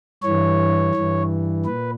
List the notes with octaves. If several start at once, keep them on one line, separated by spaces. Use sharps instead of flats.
G2 E3 C#5
G2 E3
A#2 B4